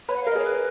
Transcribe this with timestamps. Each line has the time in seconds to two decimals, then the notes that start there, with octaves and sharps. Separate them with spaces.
0.08 B4 C#5
0.16 F#5
0.23 F5
0.27 A#4
0.30 D#5
0.35 G#4 C#5
0.44 B4